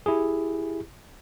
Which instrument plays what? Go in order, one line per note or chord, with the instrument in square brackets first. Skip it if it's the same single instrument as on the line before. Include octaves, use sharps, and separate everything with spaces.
[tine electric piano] E4 G4 G#4